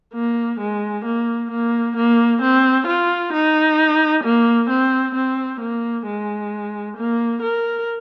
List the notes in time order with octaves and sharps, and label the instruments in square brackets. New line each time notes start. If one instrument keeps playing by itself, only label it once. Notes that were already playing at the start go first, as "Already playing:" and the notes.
[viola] A#3
G#3
A#3
A#3
A#3
C4
F4
D#4
A#3
C4
C4
A#3
G#3
A#3
A#4